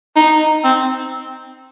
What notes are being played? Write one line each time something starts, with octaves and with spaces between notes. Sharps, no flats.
D#4
C4